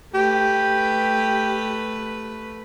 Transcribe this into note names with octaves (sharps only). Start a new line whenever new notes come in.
A3 G4 B4